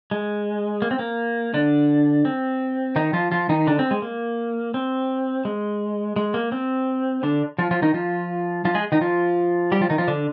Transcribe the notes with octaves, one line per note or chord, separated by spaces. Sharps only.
G#3
A#3
C4
A#3
D3 D4
C4
D#3 D#4
F3 F4
F3 F4
D#3 D#4
D3 D4
C4
G#3
A#3
C4
G#3
G#3
A#3
C4
D3 D4
F3 F4
F3 F4
D#3 D#4
F3 F4
F3 F4
G#3 G#4
D#3 D#4
F3 F4
G3 G4
F3 F4
D#3 D#4
F3 F4
D3 D4